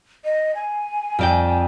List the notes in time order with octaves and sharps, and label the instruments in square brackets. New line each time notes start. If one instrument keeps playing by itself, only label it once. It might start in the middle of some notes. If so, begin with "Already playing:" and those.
[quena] D#5
G#5
[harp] F2 D5 G5